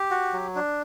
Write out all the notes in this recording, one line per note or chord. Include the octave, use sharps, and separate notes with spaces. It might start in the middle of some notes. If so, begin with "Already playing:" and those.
Already playing: G4
F#4
F#3
D4